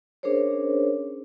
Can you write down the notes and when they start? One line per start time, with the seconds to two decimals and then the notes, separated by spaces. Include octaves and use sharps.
0.23 C#4 D4 G#4 A#4 C5 C#5